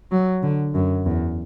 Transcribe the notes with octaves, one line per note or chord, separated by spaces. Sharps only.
F#3
D3
F#2
E2